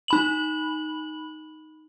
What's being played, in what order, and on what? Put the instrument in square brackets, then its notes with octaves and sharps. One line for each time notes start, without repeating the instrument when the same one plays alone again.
[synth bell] D#4 B5 F#7